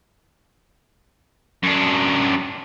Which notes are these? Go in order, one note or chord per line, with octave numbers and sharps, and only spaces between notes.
F#2 D4